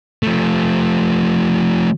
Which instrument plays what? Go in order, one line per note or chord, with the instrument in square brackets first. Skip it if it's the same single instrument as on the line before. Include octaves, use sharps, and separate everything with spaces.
[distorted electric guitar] F3 A3